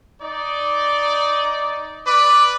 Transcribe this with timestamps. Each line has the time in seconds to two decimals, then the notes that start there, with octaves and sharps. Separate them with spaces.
0.21 D#4 D5
2.06 B4 D5 D6